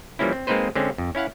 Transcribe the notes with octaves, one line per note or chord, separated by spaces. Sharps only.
E3 F3 G3 A#3 C#4 E4
C4
G#3 A#3 C4 D#4 B4 C5
D3 G#3 C4 C#4
F2
C#4 E4 F5 F#5